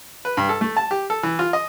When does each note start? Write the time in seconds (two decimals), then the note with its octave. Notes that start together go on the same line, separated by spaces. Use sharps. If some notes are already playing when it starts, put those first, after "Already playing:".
0.25 B4
0.37 G2
0.49 A4
0.61 A3
0.77 A5
0.91 G4
1.10 A4
1.23 E3
1.39 F4
1.53 D#5